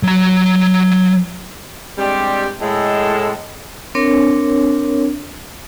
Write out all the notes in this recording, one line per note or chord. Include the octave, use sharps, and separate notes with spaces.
F#3 A#5
G3 G#3 C4 D4 G4
A2 G#3 A4
C4 D4 A#4 C#5